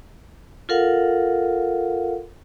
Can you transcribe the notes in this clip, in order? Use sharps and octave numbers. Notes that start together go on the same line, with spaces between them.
F4 A4 A#4 F5 F#5